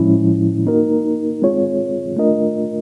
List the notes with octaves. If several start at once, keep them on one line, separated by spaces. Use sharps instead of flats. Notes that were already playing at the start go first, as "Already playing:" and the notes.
Already playing: A2 F3 G#3 C#4 E4
A#3 D#4 F#4 A#4
G#3 C4 F4 G#4 C#5
A3 D4 F4 A#4 D#5